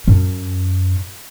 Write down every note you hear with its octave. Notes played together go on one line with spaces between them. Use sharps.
F#2 C#4